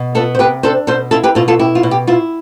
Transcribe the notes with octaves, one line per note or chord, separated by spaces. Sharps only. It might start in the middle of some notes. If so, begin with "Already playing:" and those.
Already playing: B2
B3 F4 A4
C5
C3 G4 B4
D4 A4 C5
B2 A4 C5
E4 F4 A4
G4 B4
B2 F4 A4
F4 A4
E4 G4
F4
B2
G4
E4 F4